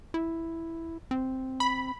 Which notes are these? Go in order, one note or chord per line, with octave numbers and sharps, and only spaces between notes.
E4
C4
B5